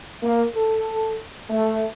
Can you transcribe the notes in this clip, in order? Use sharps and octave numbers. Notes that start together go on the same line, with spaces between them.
A#3
A4
A3